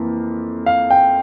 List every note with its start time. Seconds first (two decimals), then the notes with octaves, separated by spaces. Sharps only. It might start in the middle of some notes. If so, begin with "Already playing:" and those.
Already playing: F2 E3 A#3
0.66 F5
0.90 G5